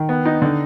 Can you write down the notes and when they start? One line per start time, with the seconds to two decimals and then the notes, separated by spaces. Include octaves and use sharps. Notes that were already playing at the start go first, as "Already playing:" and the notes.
Already playing: D#3
0.09 B3
0.25 D#4
0.42 D3